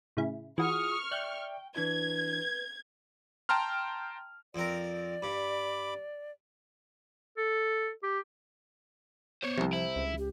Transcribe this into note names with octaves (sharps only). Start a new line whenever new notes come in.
A2 C#3 E4
E3 F4 F#4 G#4 C#6 D#6 F6
D5 E5 G5 F#6 G6
E3 D4 E4 B4 G#6
G5 A5 A#5 C6 F6
F2 C4 A#4 D5
G2 B5 D6
A4
G4
B3 C5 C#5
C2 C3 F3
E4 C5
C#2
G4